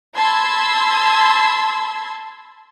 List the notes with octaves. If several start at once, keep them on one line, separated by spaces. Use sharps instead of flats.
A5 B5 C6 E6 G#6